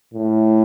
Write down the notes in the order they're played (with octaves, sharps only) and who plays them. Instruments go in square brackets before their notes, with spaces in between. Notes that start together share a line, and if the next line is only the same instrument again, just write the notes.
[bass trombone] A2